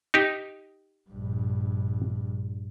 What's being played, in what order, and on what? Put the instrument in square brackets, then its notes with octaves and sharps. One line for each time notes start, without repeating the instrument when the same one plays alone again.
[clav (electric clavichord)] D#4 G4
[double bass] A#1 G2